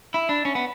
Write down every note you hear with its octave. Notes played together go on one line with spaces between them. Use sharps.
E4
D4
C#4
B3